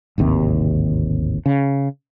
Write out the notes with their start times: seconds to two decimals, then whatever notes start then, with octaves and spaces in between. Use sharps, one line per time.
0.18 D1 G#1 D#2 C3
1.46 C#3